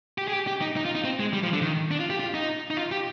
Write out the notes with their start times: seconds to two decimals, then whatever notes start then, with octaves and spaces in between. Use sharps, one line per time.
0.18 G4
0.28 G#4
0.33 G4
0.47 G4
0.61 D#4
0.77 D#4
0.85 F4
0.95 D#4
1.04 C4
1.20 G#3
1.33 G3
1.43 F3
1.53 D3
1.62 D#3
1.91 D4
2.00 F4
2.10 G4
2.20 F4
2.34 D#4
2.70 D#4
2.77 F4
2.91 G4